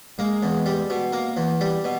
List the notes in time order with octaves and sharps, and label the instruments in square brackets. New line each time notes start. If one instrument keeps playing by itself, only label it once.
[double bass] G#3 [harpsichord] A#3
[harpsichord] E2
G3
B2
A#3
E2
G3
B2